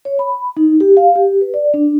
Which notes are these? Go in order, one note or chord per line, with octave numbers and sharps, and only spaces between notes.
C#5
B5
D#4
G4
F5
G4
B4
D5
D4